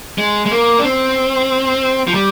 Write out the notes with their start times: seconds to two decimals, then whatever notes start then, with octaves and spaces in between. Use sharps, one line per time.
0.18 G#3
0.46 G#3
0.51 A#3
0.79 D4
0.84 C4
2.07 F3
2.14 G3